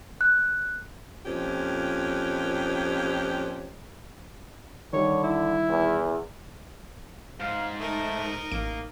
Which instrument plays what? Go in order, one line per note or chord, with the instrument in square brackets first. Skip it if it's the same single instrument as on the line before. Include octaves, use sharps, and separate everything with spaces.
[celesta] F#6
[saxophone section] F2 A#2 C#4 G4
[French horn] D3 [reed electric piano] D#3 G3 [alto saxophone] C#5
[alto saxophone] E4
[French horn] E2
[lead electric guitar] G#2 [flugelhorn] F5
[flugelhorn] A3 [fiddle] D#4 A#4
[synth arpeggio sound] A1 D7 [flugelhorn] A#3